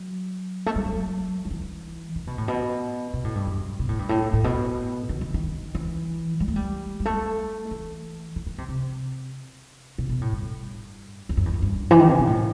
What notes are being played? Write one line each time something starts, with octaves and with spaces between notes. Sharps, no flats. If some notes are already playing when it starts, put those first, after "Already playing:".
Already playing: F#3
A3
G3
F#3
F#3
E3
D#3
B2
A2
B2
B2
A2
G2
F#2
B2
A2
G2
A2
A2
B2
D#3
E3
D#3
E3
G3
A3
G3
G3
A3
E3
E3
D#3
C3
C3
B2
B2
A2
G2
E2
F#2
E2
F#2
G2
E3
D#3
C3
B2
A2